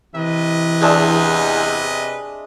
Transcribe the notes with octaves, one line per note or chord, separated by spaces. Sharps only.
C3 E3 B4 D#5
E2 G#3 D4 E5